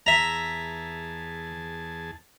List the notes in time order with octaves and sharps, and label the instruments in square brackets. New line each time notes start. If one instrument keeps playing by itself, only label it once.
[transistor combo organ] E2 G#4 A5 [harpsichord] E5 A#5